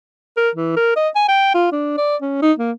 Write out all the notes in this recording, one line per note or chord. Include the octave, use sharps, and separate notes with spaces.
A#4
E3
A#4
D#5
G#5
G5
F4
D4
D5
C#4
D#4
A#3